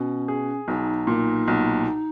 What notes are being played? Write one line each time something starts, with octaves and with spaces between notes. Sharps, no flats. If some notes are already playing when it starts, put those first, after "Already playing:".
Already playing: B2 C#4
G#4
B1 D#4
A#2
B1